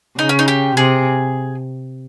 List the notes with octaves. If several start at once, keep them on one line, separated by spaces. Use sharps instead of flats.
C#3 D#4
C#4
D#4
G4
C3 G#4